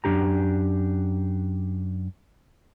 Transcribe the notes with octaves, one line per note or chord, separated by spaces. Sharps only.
F#2 B2 D4 G4 A#5